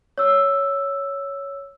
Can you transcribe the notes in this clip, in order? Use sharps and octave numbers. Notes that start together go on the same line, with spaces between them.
C#5 E6